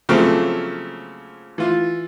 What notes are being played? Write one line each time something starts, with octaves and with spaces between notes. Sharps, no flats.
C#3 F3 F#3 A3 A#3 C4
E3 F4